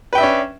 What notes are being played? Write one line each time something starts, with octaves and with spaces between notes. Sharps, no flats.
C#4 D4 B4 E5 G5